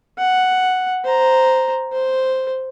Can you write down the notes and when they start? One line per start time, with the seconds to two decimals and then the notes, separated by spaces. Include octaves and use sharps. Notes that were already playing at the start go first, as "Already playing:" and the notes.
0.18 F#5
1.04 C5 A#5
1.92 C5